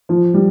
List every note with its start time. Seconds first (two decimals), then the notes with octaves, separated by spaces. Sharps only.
0.09 F3
0.34 G3